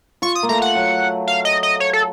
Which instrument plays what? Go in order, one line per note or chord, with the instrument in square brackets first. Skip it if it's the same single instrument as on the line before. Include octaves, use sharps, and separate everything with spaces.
[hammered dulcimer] F4 [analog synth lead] C#6
[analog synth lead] D#6
[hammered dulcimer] A#3
[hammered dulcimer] A3 [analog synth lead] A#5
[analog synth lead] F#5
[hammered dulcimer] F#3
[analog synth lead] F5
D#5
D#5
C#5
A4